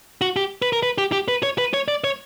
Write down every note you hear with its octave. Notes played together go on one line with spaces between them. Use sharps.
F#4
G4
B4
A#4
B4
G4
G4
B4
C#5
B4
C#5
D5
C#5